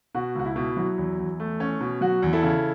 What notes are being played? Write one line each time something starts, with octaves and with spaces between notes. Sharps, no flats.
B2 F#4
C#2 F#4
E4
B2
F#3 E4
E2
E2
A3
C#4
B2
F#3 F#4
E2
E4 A4
C#3